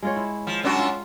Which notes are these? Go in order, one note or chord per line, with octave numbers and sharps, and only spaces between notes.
G#3 F4 C#5
E4
F3
F#2 D4 F#4
F4